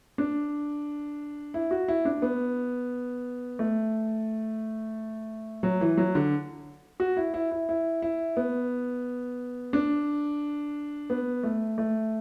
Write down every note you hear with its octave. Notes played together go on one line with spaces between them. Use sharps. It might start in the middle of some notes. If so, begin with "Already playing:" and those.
D4
E4
F#4
E4
D4
B3
A3
F#3
E3
F#3
D3
F#4
E4
E4
E4
E4
E4
B3
D4
B3
A3
A3